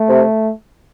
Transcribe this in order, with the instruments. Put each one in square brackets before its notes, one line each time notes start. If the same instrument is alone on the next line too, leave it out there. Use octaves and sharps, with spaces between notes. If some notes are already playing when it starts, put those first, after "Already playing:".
Already playing: [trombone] A3
[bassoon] C3